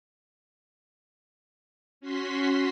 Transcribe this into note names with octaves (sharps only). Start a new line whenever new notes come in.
C#4 F#4 C6 B6